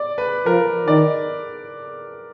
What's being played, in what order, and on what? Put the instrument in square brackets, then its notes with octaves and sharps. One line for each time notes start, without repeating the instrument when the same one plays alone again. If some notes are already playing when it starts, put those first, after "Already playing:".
Already playing: [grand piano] D5
B4
[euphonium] F3 [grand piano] A#4
[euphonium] D#3 [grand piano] D5